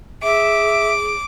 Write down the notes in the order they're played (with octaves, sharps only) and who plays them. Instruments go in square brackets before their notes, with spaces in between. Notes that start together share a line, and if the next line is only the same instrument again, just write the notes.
[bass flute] G#4 [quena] E5 [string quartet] D6